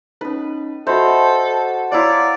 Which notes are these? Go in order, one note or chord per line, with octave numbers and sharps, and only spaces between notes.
C#4 D#4 B4
F#4 A4 C5 D#5 E5 B5
C5 D#5 A5
E4 C#5 D5 F5 F#5 A#5 C6